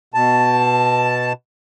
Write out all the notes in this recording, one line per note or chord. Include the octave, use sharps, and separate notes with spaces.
B2 A5